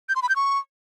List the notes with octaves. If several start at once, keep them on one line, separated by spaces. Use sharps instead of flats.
G6
C6
B5
G6
C#6